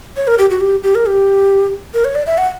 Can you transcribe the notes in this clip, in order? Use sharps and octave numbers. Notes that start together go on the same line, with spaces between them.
C#5
A#4
G4
F#4
G4
G4
A#4
G4
A#4
C#5
D5
E5
F#5